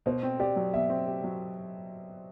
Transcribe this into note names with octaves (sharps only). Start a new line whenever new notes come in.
B2 C5
C4
G4 D5
F#3
B2 E5
C4
G4
F#3